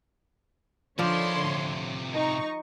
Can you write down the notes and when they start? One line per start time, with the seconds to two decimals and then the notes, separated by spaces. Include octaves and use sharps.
0.99 D3 D#3 F3 E4 C#5 D5 C6
1.44 A2 C3
2.13 D#4 C#6